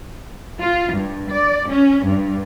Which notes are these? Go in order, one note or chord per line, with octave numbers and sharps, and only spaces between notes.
F4
G2
D5
C#4
G2